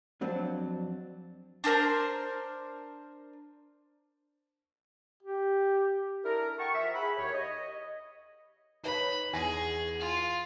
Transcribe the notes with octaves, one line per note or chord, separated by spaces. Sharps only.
F2 F#3 C4 D4
D4 A4 A#4 C5
G4
D4 E4 A4 A#4
F#5 G5 A5 C#6
F3 A#4 E5
E4 G#4 F#5 B5
D#2 G4 C#5
D#5
D#4 B4 C#5 B5
E2 G#4 G#5 A#6
F4